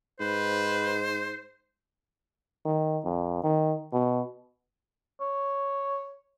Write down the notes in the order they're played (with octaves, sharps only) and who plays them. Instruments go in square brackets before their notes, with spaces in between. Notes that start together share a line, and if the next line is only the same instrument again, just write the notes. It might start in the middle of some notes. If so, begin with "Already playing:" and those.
[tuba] G#2 [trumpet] B4 [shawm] C5
[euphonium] D#3
F2
D#3
B2
[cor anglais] C#5